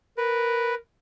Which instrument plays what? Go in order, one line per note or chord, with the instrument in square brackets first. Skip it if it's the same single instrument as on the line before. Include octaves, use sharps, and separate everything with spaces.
[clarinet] A#4 [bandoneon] B4